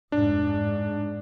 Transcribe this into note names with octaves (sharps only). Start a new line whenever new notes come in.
F1 G#2 D4
G#2